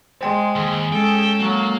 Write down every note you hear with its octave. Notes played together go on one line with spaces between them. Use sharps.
G#3 C5 G5 C6
D#2 G#4
G#3 C#4 A4 G5
F#3 A#3